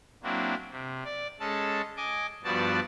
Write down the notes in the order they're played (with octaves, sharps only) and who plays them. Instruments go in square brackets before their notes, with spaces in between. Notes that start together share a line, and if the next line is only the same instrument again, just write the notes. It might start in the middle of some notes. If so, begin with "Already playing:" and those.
[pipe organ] F#3 A#3 C4 D4 E4
C3
D5
G#3 C#4 A4 A5
D#5 G#5 D6
G2 F3 B3 F#4 D5 A5